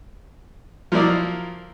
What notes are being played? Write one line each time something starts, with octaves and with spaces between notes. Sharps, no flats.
F3 F#3 A#3 E4 D5 D#5